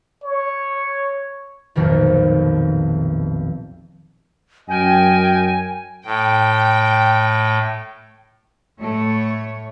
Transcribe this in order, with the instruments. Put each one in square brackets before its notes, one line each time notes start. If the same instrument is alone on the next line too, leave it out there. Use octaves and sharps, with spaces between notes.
[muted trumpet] C#5
[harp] F1 B1 F2 A#2 D#3
[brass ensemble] F#2 [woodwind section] A#4 D#5 G5 [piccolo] G#5
[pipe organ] A2 [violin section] G5
[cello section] A2 A3 C#5